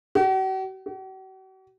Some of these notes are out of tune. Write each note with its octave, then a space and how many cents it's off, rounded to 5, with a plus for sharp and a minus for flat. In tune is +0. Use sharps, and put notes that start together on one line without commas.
F#4 +45
F#4 +45